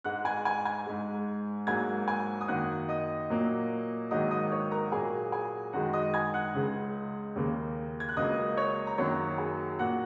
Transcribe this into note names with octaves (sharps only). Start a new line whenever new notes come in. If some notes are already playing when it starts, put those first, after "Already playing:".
G#2 G#3 F#5 F#6
G#5 G#6
G#5 G#6
G#5 G#6
G#2 G#3
G#2 F#3 A#3 G#5 G#6
G#5 G#6
D#6
F#2 D#3 A#3 F#5 F#6
D#5 D#6
A#2 F#3 A#3
G#2 D#3 F#3 A#3 D#5 D#6
D#5 D#6
C#5 C#6
A#4 A#5
A#2 F#3 A#3 G#4 G#5
G#4 G#5
F#2 D#3 G#3 F#4 F#5
D#5 D#6
G#5 G#6
F#5 F#6
C#2 C#3 G#3
D#2 C#3 A#3
G#6
F#6
C#2 C#3 F#3 A#3 D#5 D#6
C#5 C#6
A#5
F#2 D#3 F#3 A#3 C#5 C#6
G#4 G#5
A#2 A#3 F#4 F#5